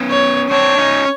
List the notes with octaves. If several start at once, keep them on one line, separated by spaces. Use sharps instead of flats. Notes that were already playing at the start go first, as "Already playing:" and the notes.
Already playing: B3 C#4
C#5
C4 D4 C#5
C#4 D#4